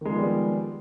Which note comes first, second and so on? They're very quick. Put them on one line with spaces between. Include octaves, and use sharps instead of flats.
D#3 G#3 F3 B3 G3